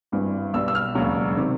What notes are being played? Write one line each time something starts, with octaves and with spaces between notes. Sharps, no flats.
G#1 G2 E3 G3
B1 B2 G3 E6
E6
F6
E1 D#2 C#3 F#3
C3 D#3